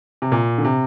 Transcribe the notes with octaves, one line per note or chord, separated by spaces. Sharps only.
C3
A#2
D3
C3